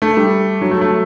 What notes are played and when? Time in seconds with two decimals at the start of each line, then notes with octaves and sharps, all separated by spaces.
0.02 A3
0.17 G3
0.61 F#3
0.71 A3
0.81 A3